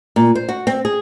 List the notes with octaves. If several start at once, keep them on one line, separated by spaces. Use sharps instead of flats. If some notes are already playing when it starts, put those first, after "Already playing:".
A#2
C5
F#4
C4
G#4